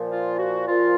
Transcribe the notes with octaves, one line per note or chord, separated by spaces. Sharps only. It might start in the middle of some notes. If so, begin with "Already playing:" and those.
Already playing: A#2 F3
F4
F#4
A#2 F3 F4